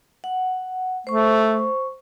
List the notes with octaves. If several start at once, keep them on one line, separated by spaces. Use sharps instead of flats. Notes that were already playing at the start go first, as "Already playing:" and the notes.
F#5
A3 C5 C#6